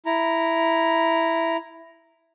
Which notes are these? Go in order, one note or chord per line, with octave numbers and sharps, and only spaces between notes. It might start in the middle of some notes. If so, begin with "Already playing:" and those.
E4 A#5